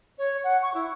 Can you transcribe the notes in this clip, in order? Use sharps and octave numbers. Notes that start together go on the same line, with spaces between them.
C#5
F#5
C#6
E4